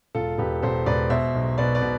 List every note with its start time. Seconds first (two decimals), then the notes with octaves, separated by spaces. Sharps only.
0.15 E1 F4 A4
0.38 E1 G4 B4
0.62 E1 A4 C5
0.86 E1 B4 D5
1.10 B2 C5 E5
1.35 B1
1.58 B2 B4 D5
1.75 B4 D5
1.82 B2